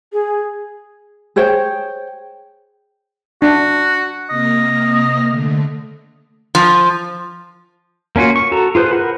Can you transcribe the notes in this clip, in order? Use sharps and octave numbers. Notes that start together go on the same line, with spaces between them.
G#4
G#4 C5 C#5 G5
D4 F#4
C3 A#3 D#5 F6
D3 A3
F3
A#3 C#4 F4 F#4
C#6
F#4 A4 A#5
F4 G#4 B4 C5
A#4 F#5 B5